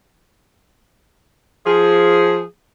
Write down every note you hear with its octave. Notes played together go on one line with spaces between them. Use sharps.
F3 G#4